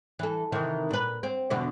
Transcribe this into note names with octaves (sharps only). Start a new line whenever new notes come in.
E3 A4
C3 D#3 E3
A#2 B4
C4
E2 B2 D3